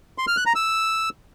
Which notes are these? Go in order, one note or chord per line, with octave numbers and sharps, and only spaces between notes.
C6
F6
F#6
A#5
E6